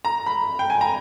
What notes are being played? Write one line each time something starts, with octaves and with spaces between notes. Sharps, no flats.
A#5
B5
G5
G#5
A#5